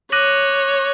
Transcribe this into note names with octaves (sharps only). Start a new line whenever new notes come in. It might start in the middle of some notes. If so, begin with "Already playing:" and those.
C#5 D6 F#6 A#6 D#7 F#7